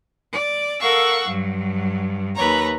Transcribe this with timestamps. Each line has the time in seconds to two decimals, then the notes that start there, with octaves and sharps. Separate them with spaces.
0.31 D5
0.80 A4 A#4 F5 F#5 C#6 E6
1.26 G2 F#3
2.35 D#2 B4 C#5 A#5